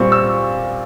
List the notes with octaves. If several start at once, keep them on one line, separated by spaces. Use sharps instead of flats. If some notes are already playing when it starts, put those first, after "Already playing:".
Already playing: A#2 G3 C4 C#6
E6